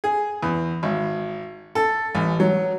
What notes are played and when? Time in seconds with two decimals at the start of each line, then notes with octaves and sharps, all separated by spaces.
0.04 G#4
0.43 E2
0.83 G#1
1.75 A4
2.15 A1
2.40 F#3